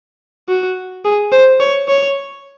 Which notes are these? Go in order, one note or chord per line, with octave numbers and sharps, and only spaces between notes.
F#4
G#4
C5
C#5
C#5